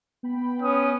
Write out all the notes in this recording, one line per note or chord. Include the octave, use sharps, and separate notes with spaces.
B3 G5 B5
C#4 B4 D#6